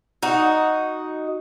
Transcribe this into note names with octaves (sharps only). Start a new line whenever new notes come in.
D#4 F#4